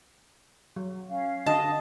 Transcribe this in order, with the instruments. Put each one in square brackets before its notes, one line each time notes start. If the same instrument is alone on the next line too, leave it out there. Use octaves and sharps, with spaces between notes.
[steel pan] F#3
[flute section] C#4 F5
[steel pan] D3 D4 F#4 [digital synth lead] D#5 [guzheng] A5